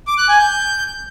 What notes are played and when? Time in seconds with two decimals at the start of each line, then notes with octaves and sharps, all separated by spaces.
0.07 D6
0.18 F#6
0.29 G#5
0.39 G6